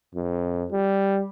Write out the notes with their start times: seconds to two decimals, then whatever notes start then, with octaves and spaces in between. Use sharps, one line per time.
0.15 F2
0.72 G3